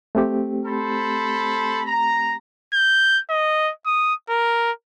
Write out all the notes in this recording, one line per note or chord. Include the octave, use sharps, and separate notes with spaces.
A3 C4 G4
A4 C5 B5
A#5
G6
D#5
D#6
A#4